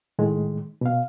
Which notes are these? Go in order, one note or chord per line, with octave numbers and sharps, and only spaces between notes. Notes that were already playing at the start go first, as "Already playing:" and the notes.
A2 D#3 G#3
B2 F5